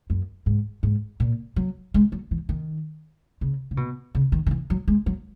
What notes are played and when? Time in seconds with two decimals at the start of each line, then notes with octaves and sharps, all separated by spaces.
0.10 F#2
0.46 G#2
0.83 G#2
1.20 A#2
1.56 F#3
1.94 G#3
2.12 F#3
2.31 E3
2.49 D#3
3.41 C#3
3.71 C#3
3.77 B2
4.15 C#3
4.32 D#3
4.46 D#3
4.51 E3
4.70 F#3
4.88 G#3
5.06 F#3